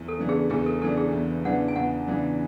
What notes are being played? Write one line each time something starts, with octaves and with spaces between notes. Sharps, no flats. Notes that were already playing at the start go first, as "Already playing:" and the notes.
Already playing: E2
A4
C#3 E3 B3 D4
G#4
E2 G#4
A4
C#3 E3 B3 D4 A4
G#4
E2
C#3 E3 B3 D4 F#5
G#5
E2 F#5
C#3 E3 B3 D4